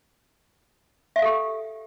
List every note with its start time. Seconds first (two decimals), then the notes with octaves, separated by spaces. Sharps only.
1.16 E5
1.19 F5
1.22 A4
1.25 G4